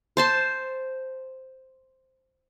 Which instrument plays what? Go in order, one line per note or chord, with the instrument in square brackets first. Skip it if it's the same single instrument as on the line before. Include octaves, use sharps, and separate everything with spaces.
[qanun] C5 A5 C6